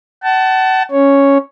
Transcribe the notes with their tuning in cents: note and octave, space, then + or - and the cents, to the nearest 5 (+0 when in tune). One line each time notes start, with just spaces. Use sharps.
F#5 +35 A5 +0
C#4 +0 C#5 +0